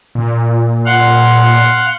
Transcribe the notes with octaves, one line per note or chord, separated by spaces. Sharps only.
A#2
F5 F#5 C6